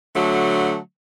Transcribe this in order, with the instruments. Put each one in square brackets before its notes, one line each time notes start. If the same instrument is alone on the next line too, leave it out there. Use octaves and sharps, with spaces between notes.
[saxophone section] D3 F#3 A3